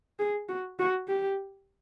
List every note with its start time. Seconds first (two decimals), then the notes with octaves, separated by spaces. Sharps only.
0.20 G#4
0.49 F#4
0.79 F#4
1.09 G4